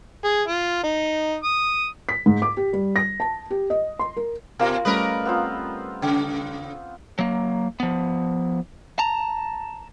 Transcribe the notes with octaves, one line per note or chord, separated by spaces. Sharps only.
G#4
F4
D#4
D#6
B6
G#2
D6
G4
G3
A#6
A5
G4
D#5
C6
A#4
B2 A#3 F4
G3 A3 C#4 A#4 B4 D#5
B3 C4 F4
C#3
F#3 A#3
F3 B3
A5 A#5